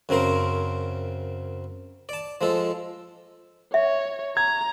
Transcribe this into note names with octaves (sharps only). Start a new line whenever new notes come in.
F#2 C#3 C4 A#4 C5
D5 A5
F3 G#3 A4
C#5 E5
A#5 G#6